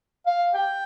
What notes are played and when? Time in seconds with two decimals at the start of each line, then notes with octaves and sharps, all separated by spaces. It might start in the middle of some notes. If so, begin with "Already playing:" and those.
0.26 F5
0.54 G5